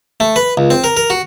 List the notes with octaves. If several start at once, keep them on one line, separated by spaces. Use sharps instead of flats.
A3
B4
C#2
C4
A#4
A#4
F#4